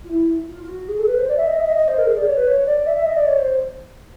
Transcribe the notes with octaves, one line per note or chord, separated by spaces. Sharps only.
F4
E4
F4
F4
F#4
G#4
A4
B4
C5
D5
E5
D#5
E5
D#5
D#5
C5
A#4
G#4
D5
C#5
B4
C#5
D5
E5
E5
D#5
D5
C#5
C5